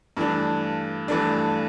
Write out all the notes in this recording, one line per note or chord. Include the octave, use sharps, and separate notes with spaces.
G2 E3 A3 D4
G2 E3 A3 D4